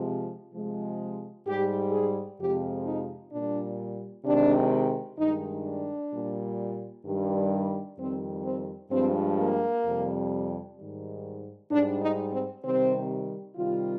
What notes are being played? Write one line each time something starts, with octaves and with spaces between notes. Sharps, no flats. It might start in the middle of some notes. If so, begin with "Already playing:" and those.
Already playing: C3 F3 G#3
C3 F3 G#3
G#2 G3 G4
G#4
F2 C3 F3 G#3 G4
D#4
A#2 G3 D4
C3 D#3 G#3 D4
G2 D#3 G#3 D#4
D4
A#2 G3
G2 D#3 G3
F2 D#3 G3 C4
C4
G2 F3 G#3 C4
A#3
F2 C3 G3
G#2 D#3 G3
G#2 G3 D4
D#4
C4
C3 D#3 G3 C4
C3 D#3 G3 F4